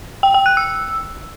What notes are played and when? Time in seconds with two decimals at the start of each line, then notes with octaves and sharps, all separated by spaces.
0.23 G5
0.34 G5
0.46 F#6
0.57 E6